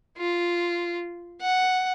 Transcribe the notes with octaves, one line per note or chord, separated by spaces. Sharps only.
F4
F#5